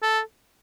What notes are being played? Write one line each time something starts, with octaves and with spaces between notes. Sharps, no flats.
A4